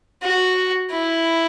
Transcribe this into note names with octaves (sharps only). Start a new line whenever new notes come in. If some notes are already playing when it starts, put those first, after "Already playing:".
F#4
E4